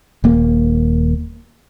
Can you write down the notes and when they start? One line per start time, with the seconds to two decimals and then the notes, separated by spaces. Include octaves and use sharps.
0.24 D#1 A#3